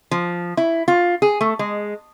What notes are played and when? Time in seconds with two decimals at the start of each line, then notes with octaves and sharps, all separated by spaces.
0.11 F3
0.57 E4
0.88 F4
1.22 G#4
1.41 A3
1.59 G#3